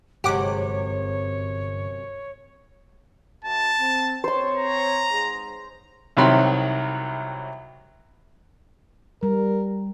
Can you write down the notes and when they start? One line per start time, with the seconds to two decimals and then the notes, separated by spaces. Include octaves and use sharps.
0.24 G1 F#2 C3 G#3 G4 C#5 F#5 D6
3.44 F#2 A5
3.80 C4
4.24 C4 C5 C#5 C6
4.56 A#5
5.12 G#2 G#4
6.17 C2 C3 D#3 F#3 B5 C6
9.23 G3 A#4